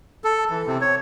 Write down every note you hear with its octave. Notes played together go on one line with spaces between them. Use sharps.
A4
E3
C3
C#5